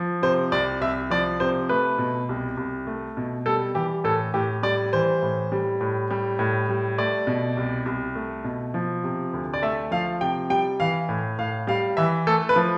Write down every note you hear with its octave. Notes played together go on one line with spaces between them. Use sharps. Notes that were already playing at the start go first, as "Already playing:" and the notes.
Already playing: F3
C3 C5
C2 D5
C2 E5
F3 D5
C3 C5
A3 B4
B2
C2
C2
A3
B2
G3 A4
E3 G4
A2 A4
A2 G4
G3 D5
E3 C5
A2
G3
A2
G3
A2
G3
A3 D5
B2
C2
C2
A3
B2
F3
C3
D2
D5
A3 E5
F3 F5
C3 G5
G3 G5
E3 F5
A2
A2 F5
G3 F5
E3 E5
A3 A4
B4
F3